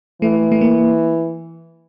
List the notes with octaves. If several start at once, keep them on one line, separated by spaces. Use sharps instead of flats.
E3 A3
A3
A#3